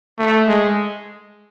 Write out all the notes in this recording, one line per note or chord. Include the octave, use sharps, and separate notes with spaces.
A3
G#3